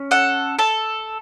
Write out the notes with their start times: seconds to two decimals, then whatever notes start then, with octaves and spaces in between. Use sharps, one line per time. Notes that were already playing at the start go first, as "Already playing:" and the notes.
Already playing: C#4
0.11 A4 F#5
0.59 A4 A5